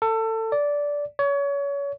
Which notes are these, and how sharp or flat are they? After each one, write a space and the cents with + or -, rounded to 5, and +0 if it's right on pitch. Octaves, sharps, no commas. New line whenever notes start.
A4 +25
D5 -15
C#5 +30